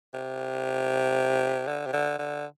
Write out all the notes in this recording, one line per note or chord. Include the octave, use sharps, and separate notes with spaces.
C3
D3
C3
D3
D3